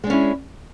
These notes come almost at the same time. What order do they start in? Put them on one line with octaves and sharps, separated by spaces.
G#3 D4 C#4 E4